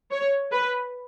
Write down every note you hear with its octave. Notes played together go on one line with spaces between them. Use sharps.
C#5
B4